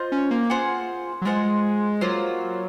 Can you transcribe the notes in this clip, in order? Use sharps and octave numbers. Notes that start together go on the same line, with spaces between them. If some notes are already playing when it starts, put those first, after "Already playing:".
Already playing: F4 C5 D#5
C#4
A#3
F4 G#4 C5 F#5
F#3
G#3 F4 G#4 C5 F#5
F#3 A#3 F4 C5